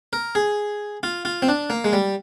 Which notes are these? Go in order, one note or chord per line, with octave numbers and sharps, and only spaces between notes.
A#4
G#4
F4
F4
C4
D4
A#3
G#3
G3